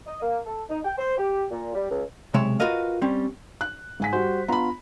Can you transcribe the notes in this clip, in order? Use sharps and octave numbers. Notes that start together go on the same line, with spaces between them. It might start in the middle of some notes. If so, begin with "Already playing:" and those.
D#5
A#3
A4
D#4
G5
C5
G4
A#2
G3
C#2
B1 C3 G#3 C#5 E5
F4 F#4 A#4 B4 D#5 F5
G3 C4 C#4
F#6
G#2 G#5 B6
G3 F#4 C5
B3 D4 F4 A#5 B5